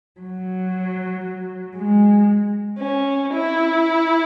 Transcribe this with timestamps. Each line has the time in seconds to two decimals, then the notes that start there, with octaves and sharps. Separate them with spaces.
0.21 F#3
1.76 G#3
2.79 C#4
3.32 E4